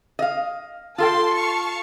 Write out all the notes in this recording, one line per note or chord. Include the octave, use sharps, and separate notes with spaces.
D#5 F5
F4 A4 G5 A5 C6
F5 A5 C#6